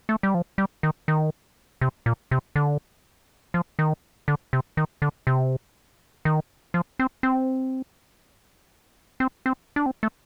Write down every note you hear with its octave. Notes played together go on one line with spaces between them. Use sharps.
A3
G3
F3
G3
D#3
D#3
C3
A#2
C3
D3
F3
D#3
D3
C3
D#3
D3
C3
D#3
F3
C4
C4
C4
C4
D4
C4
A3